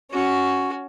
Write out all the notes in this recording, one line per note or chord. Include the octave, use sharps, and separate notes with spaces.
C#4 F#4